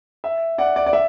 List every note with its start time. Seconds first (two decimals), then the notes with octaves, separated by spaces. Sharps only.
0.24 E5
0.58 D5 F#5
0.76 D5
0.86 D5
0.93 E5